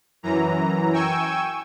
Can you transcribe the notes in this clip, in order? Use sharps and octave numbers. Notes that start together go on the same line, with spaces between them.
F#2 E3 A#5
G5 G#5 C#6 E6 G#6